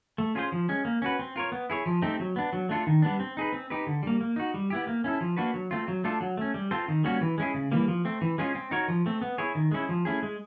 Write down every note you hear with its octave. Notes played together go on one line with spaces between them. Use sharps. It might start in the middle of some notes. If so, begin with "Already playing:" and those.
A3
C#4 F4 G#4 C5
F3
G#3 C#4
A#3
C#4 F#4 B4
C4
F4 A#4 C#5
B3
E4 G#4 C#5
F3
A3 C4 D#4 G4
F#3
B3 D4
F#3
A3 D4 F4 A4
D#3
G3 B3 D4
C4
D#4 G#4 B4
C4
D#4 G4 B4
D3
G3 A#3
A#3
D#4 F#4
G3
B3 E4 G4
A#3
C#4 E4 A4
F3
A#3 D4 F#4 B4
F#3
A3 C4 F4
F#3
A3 D4 F4 A4
F#3
A3 C#4
G3
C4 F4 A4 C5
D#3
G3 A#3 C#4 F#4
E3
G#3 C#4 E4 G#4
C#3
E3 G3 A#3
F3
A3 C4
E3
G#3 C#4 F4 G#4
C4
D#4 F#4 A#4 C#5
F3
A3 C4
B3
E4 G#4 C#5
D#3
G#3 C#4 E4
F3
A3 C#4 E4 G#4
G#3